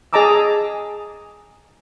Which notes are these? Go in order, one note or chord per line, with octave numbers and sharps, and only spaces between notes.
G#4 D#5 A5 A#5 D6 E6